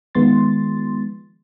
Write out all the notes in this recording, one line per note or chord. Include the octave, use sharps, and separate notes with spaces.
D#3 F3 G#3 B3 C6 A6